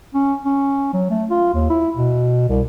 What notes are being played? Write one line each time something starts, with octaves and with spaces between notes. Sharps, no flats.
C#4
C#4
F#3
A3
F4
D#2
E4
B2
C2